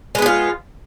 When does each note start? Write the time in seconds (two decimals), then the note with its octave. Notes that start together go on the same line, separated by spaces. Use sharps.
0.15 G#3
0.19 B3
0.22 G#4
0.26 F4